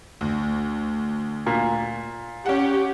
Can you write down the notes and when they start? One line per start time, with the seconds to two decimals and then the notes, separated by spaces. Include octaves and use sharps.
0.21 D2
1.46 A#2
2.46 C#4 G4 F#5